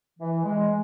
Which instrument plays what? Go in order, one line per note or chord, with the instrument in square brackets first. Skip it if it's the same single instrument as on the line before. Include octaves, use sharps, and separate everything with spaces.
[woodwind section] E3
G#3